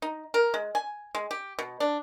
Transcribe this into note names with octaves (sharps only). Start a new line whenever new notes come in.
D#4
A#4
G#3
G#5
G#3
G4
B2
D4